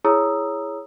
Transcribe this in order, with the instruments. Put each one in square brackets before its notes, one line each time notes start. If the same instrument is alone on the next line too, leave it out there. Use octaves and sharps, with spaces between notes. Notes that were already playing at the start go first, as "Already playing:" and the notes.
[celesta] E4 G#4 C#5 A#5 D#6 E6